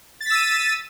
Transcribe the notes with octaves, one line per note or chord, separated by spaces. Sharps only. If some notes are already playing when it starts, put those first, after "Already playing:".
E6 A6 B6 D#7